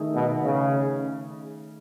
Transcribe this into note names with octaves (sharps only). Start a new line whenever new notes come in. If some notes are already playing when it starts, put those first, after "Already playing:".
Already playing: D#3 A3 D#4 G#4
B2
C#3